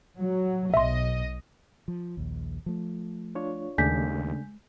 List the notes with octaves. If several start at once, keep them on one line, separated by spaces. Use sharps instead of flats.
F#3
B1 D#5 E5 C6
F3
A#1 D#2
F3 A3
D4 F4 C#5
D#2 C#3 G#3 A3 D4 G#5 G6 B6